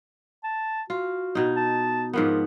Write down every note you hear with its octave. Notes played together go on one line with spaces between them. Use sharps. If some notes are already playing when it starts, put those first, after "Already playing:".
A5
F4 F#4
B2 D#4
A5
G#2 F3 B3 A#4